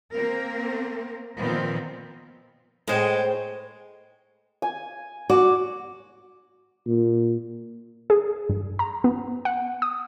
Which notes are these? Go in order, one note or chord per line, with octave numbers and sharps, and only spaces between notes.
A#3 C4 A#4
A#2 D#3 F3 B3 C4
A2 G#3 C5 G5
G#5
F#4 D5
A#2
G#4
G2
A#5
B3
F#5
D#6